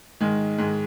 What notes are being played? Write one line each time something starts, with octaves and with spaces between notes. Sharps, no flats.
G#2 D#3 G#3
G#2 D#3 G#3